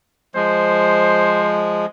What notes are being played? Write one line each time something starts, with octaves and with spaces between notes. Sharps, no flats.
F3 G#3 C5